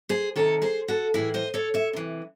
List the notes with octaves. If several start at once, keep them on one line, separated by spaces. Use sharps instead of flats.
G#4 C5
C3 D#3 A4 C#5
G#4 C5
F#4 A4
A2 E3 E4 G#4
C5 D#5
A4 C#5
C#5 E5
C3 E3